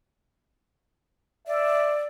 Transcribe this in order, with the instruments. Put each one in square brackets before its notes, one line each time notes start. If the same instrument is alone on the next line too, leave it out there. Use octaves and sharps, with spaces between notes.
[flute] D5 [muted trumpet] E5